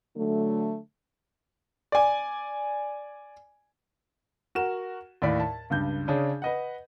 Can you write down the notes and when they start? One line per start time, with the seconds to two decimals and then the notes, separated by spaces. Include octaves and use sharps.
0.17 D3 F#3 A3
1.92 D5 G#5
4.55 F#4 A#4 E7
5.22 D#2 A2 D5 B6
5.40 A5
5.70 C#2 G2 G6
6.08 C#3 C#4 D4 G#4
6.42 B4 D#5 F#5